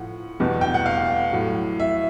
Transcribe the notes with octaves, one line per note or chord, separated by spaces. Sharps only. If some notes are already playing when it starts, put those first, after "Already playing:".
Already playing: A2 F3 F#5
E2 B2 G3
G5
F#5
F5
A2 F#3
E5